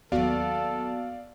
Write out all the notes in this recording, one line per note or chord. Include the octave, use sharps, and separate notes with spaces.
D#2 F#3 B3 F#4 A4 D5 F5